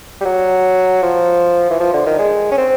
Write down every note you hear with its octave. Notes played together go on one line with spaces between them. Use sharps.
G3
F#3
F3
E3
F3
D3
D#3
G#3
C#4
C4